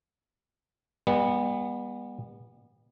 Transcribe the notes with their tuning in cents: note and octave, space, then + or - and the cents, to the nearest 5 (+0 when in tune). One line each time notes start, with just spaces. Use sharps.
G3 +40 B3 -20